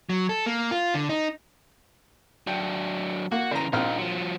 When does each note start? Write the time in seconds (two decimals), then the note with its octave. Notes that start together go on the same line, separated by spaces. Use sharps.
0.10 F#3
0.29 A4
0.46 A#3
0.71 F4
0.94 D3
1.09 D#4
2.47 F#3 D4 G5
3.32 A#3 F#4
3.51 C#3 E3 C5 A#5
3.73 A#1 C4 D#4 F4 F6
3.98 F3 F#3